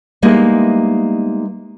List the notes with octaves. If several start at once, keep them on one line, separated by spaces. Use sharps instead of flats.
G3 G#3 A#3 B3 D#4 E4